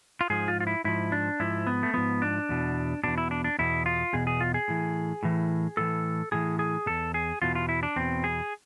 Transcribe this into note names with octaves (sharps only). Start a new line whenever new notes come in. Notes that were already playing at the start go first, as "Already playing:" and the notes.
F4
G#2 F3 G#4
F4
F4
E4
G#2 F3 E4
D4
G#2 F3 E4
B3
A3
G#2 F3 B3
D4
E2 B2
E2 B2 D4
E4
D4
D4
E2 B2 E4
F4
E2 B2 G#4
G#4
F4
G#4
A2 E3
A2 E3
A2 E3 A4
A2 E3 G#4
G#4
E2 B2 A4
G#4
E2 B2 F4
F4
E4
D4
E2 B2 C4
G#4